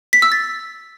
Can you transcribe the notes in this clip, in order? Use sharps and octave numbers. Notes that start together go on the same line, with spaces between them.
B6
E6
A6